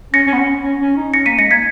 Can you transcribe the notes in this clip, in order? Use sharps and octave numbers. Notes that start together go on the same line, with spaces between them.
C#4 A#6 C#7
C#4
B3
C#4
C#4
C#4
D#4
C#4 A#6 C#7
A#3 B6 D#7
G#3 A#6 C#7
A#3 G#6 B6